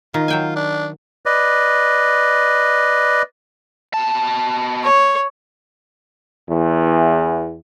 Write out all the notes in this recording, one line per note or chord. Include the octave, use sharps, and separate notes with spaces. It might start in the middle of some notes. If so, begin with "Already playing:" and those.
D#3 F4
F#3 G5 G#5
D4
B4 D5 D#5
B2 A5
C#5
E2